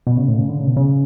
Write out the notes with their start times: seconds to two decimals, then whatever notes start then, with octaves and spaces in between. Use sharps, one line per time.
0.07 B2
0.17 C#3
0.28 A2
0.39 C#3
0.49 D3
0.58 C#3
0.67 B2
0.76 C#3